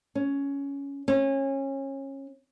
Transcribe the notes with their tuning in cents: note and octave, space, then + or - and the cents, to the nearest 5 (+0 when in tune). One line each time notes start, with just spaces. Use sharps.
C#4 +10
C#4 -25